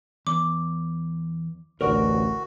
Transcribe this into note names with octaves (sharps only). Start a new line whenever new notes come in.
E2 D6
A1 D2 F#4 A#4 D5